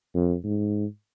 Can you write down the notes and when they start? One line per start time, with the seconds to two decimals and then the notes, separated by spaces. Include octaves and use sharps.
0.15 F2
0.44 G#2